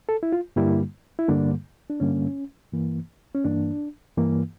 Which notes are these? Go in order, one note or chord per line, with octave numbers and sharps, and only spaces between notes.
A4
E4
F4
G2 D3 G3 A#3 E4
E4
G2 D3 G3 A#3 D4
D4
G2 D3 G3 A#3 C#4
G2 E3 A#3
C#4
G2 E3 A#3 D4
G2 E3 A#3